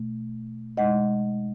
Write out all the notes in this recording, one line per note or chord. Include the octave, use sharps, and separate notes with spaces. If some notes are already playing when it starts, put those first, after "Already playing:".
Already playing: B2 A3
B2 G#3 D#4 D#5 F#5